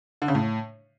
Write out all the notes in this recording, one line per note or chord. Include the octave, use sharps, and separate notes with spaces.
D3
C#3
A2